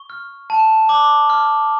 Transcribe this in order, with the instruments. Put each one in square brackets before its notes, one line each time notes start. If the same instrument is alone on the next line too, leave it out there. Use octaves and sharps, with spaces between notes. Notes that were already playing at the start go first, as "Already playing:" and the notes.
Already playing: [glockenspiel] C#6
F6
A5
D6
F6